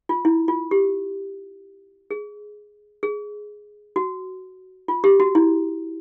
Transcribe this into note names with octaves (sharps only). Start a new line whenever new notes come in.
F4
E4
F4
G4
G#4
G#4
F#4
F4
G4
F#4
E4